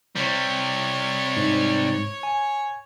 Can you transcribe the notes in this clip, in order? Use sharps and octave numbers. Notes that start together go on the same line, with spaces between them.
C3 G3 C#5
G#2
G#5